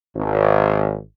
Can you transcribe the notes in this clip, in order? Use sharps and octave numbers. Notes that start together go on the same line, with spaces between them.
G#1